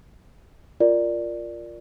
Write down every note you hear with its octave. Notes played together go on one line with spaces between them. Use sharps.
F4 A#4 D5